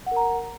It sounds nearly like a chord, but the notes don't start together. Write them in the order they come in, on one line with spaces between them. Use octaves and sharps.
F#5 A#4 A#5